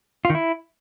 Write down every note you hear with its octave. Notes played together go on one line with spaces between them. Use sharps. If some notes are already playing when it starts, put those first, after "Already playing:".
F4
D#3
E4